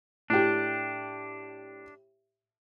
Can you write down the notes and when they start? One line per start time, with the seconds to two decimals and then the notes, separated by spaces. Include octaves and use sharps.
0.30 A2 D4 G4